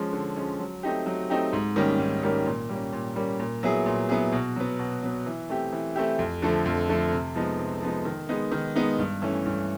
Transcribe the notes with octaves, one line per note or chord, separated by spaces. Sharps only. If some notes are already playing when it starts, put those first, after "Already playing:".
Already playing: F3 G#3 C#4
D3
F3 G#3 C#4
F#3
A3 C4 D#4 G4
F#3
A3 C4 D#4 G4
G#2
D#3 G3 A#3 C#4
G#2
D#3 G3 A#3 C#4
A#2
G3 A#3 C#4
A#2
G3 A#3 C#4
A#2
F#3 B3 E4 G#4
A#2
F#3 B3 E4 G#4
B2
F#3 B3
B2
F#3 B3
E3
A3 C4 E4 G4
E3
A3 C4 E4 G4
F2
D3 F3 A3
F2
D3 F3 A3
C3
F3 G#3 B3 D#4
C3
F3 G#3 B3 D#4
D#3
G#3 B3 D#4
D#3
G#3 B3 D#4
G2
E3 A3 C#4
G2